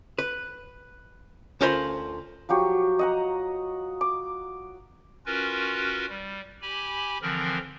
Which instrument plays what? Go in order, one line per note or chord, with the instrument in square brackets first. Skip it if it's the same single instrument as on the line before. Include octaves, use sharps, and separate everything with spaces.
[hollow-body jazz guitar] B4
D2 C#4 F4 A#4 C5 B5
[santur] F3 F#3 G4 C#6
D#5 F#5 A#5
D6
[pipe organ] C#4 F4 F#4 A#4 B4
G3
G4 G#5 B5
D3 E3 F3 C4 A#4